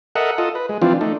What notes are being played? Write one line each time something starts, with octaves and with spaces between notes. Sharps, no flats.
A4 A#4 D#5 E5 F#5
F4 A4 D#5
B4
G#3
E3 F3 C4 D4 F4
A3 D4 D#4